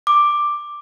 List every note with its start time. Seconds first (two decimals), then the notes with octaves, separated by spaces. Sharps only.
0.07 D6